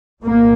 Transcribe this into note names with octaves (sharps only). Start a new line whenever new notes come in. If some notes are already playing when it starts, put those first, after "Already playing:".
C2 A#2 A#3